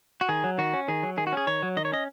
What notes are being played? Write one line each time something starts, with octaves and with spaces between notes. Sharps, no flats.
F#4
D#3 G#4
F#3
D#3 F#4
C#4
D#3 G#4
F#3
D#3 G#4
F#4
C#4 G#4
D#3 C#5
F#3
D#3 D#5
C#5
C#4 D#5